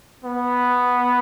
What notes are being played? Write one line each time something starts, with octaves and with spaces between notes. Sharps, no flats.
B3